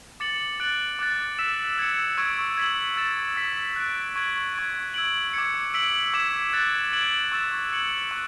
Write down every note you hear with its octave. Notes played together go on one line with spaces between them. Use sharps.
D6 A6 C#7 F#7
F#6 A6 D7 F#7
D6 F#6 A6
E6 B6 E7
E6 G#6 C#7
C#6 E6 G#6 D7
G#6 B6 F#7
E6 A6 E7
E6 B6 F#7
F#6 A6 D7
C#6 G#6 D7 F#7
C#6 G#6 D7
E6 G#6 D7 F#7
D6 G#6 C#7
E6 B6 D7 F#7
D6 G#6 B6 E7
F#6 A6 E7
G#6 D7 F#7
C#6 E6 A6 E7
G#6 C#7 F#7
C#6 F#6